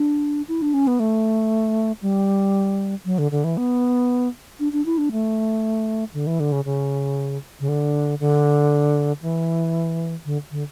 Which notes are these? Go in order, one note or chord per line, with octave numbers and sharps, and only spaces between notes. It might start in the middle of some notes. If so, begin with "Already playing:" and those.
Already playing: D4
E4
D4
C#4
B3
A3
G3
F#3
D3
D3
E3
B3
D4
D4
E4
D4
A3
D3
E3
D3
C#3
C#3
C#3
D3
D3
E3
D3
D3